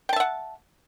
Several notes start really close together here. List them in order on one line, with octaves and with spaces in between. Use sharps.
G5 A5 E5 F#5